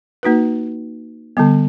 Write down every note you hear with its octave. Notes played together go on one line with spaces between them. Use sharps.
A#3 D#4 F#4 B4
D3 G3 B3